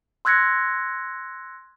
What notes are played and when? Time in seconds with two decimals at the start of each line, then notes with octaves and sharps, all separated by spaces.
0.25 C6 E6 F#6 G#6 A#6 C#7